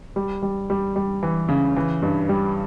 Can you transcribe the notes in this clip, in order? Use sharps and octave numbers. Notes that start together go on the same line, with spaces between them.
G3
G3
G3
G3
E3
C#3
E3
G2
G3